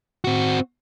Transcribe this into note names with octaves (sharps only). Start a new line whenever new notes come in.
C4 F#4